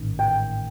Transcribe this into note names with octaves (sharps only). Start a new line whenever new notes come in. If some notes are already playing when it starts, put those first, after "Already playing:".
Already playing: A1 G#2 D#3
G5